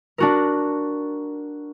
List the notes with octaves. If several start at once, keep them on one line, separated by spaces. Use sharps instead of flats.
D4 F#4 A#4